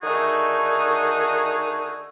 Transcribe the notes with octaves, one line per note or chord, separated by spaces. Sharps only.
D3 D#3 A3 D#4 F#4 G#4